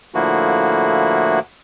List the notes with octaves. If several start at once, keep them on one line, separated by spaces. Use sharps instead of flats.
A2 D3 F3 A#3 E4 F#4